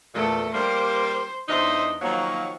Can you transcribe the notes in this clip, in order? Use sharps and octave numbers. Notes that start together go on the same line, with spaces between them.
E2 A#2 A3 A4
G3 A#3 C5
E2 D4 D#4 C5 E5
D#3 F3 F#3 A#3